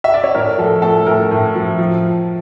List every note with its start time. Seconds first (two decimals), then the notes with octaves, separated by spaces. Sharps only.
0.04 E5
0.14 D5
0.24 C#5
0.35 A2 A#4
0.58 F3 A4
0.82 A3 A4
1.06 A2 A#4
1.31 A2
1.55 F3
1.78 F3